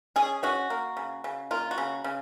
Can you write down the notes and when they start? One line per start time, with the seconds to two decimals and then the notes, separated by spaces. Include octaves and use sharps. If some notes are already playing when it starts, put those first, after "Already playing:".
0.16 C#4 G#4
0.43 C#4 F#4
0.70 A#3
0.97 C#3
1.24 C#3
1.51 A#3 F4
1.71 F#4
1.78 C#3
2.04 C#3